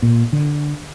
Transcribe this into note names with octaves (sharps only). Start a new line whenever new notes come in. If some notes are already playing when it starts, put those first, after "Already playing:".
A#2
D3